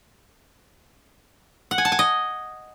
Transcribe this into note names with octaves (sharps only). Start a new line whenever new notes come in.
F#5
G#5
A5
G#5
D#5